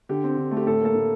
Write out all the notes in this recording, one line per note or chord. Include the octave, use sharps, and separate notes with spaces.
D3 G4
C4
D3
A3
G4
A2 A4
A#3 A4
A2